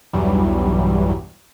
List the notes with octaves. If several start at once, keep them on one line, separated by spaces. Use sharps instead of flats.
B1 E2 G2 E3 F#3 G3